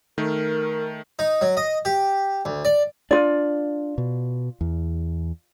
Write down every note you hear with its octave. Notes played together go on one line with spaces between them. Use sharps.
D#3 A3 A#4
D#4
F#3
D#5
G4
D2
D5
D4 F4 D5
B2
E2